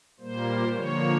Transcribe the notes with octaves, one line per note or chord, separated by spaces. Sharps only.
A#2 G3 A#3 C5
D3 F3 A#3 C#5